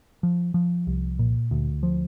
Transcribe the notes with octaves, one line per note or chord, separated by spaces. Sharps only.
F3
F3
C2
A#2
D2
F3